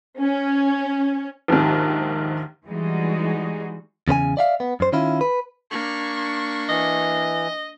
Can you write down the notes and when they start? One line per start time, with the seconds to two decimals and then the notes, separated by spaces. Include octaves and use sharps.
0.19 C#4
1.48 A#1 D#2 G#2 D#3
2.66 E3 G3 G#3 D#4 F#4 G#4
4.08 E2 C#3 B4 G#5
4.37 D5 E5 F5
4.60 B3
4.80 F#2 C5
4.92 D#3 C#4 E4 F4
5.21 B4
5.71 A#3 D4 C#6
6.69 E3 D#5